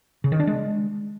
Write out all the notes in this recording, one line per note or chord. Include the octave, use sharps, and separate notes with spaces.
C#3
D#3
D4
G#3